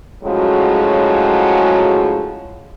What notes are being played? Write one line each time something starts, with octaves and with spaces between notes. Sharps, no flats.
A2 C#3 F3 F#3 G#3 F#4